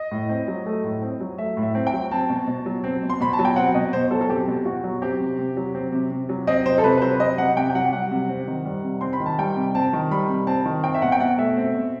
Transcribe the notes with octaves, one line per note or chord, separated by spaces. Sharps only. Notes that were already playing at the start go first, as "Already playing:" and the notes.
Already playing: D#5
A2
C4
F#3
A3
A2
C4
F#3
A3 E5
A2
E5
C4
G5
F#3
C4 A5
B2
B2
F#3
C4
B2
C6
B2 B5
A5
F#3
G5
C4 F#5
B2 D#5
B2 C5
F#3 A4
A4
C4 G4
B2
B2 F#4
F#3
C4 G4
C3
C3
F#3
C4
C3
C3
F#3
C4 D#5
C3 C5
A4
C3 B4
B4
F#3 C5
C4 D#5
C3 F#5
C3 G5
G5
F#3 F#5
G3 F#5
C3
C4
D#3
G3
C3
C4 C6
B5
D#3
A5
G3 G5
C3
C4 A5
D#3
G3 B5
C3
C4 A5
D#3
C4 G5
E5
B2 F#5
G5
B2 F#5
A3 E5
C4
B2